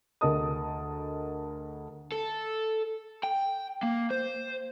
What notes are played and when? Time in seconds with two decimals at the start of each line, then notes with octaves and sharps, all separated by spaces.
0.21 D2 G#4 A#4 D#5 A5 D#6
2.12 A4
3.23 G5
3.83 A#3
4.11 C5